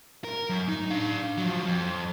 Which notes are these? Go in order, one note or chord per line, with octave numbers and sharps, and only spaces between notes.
A#4
F#2
D#4
D4 F5
F3 F#3
F2